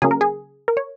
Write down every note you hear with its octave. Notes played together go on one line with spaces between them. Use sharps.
C#3 F#3 A#3 C#4 G#4
A#4
G#4
A#4
C#5